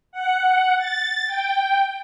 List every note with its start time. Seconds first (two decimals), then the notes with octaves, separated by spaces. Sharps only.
0.12 F#5
0.78 A6
1.27 G5